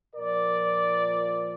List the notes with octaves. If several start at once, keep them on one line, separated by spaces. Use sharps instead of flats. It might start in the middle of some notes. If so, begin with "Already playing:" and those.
A#2 F3 A#4 D5